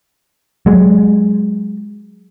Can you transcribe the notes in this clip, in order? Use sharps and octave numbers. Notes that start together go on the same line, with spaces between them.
F#3 G#3